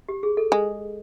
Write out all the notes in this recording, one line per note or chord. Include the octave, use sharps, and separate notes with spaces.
G4
G#4
A4
G#3